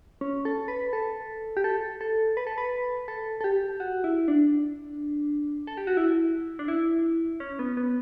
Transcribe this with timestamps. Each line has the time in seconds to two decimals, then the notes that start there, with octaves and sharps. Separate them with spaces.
0.21 C#4
0.45 A4
0.68 B4
0.93 A4
1.57 G4
1.64 A4
2.01 A4
2.37 B4
2.47 A4
2.58 B4
3.08 A4
3.41 A4
3.44 G4
3.80 F#4
4.04 E4
4.28 D4
5.67 A4
5.77 G4
5.87 F#4
5.97 E4
6.59 D4
6.68 E4
7.40 C#4
7.59 B3
7.77 B3